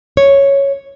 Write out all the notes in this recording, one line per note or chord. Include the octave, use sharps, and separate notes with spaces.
C#5